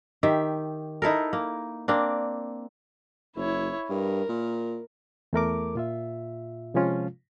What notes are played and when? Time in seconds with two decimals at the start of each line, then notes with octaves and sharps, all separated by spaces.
0.23 D#3 G4 E5
1.02 D#4 E4 A4 A#4
1.33 A#3
1.88 A#3 C4 D4
3.36 F#1 E4 C#5
3.89 G2 A#4
4.29 A#2
5.33 E2 A3 A#4 D6
5.75 A#2 F4 E5
6.74 C3 F3 G#3 C#4 F4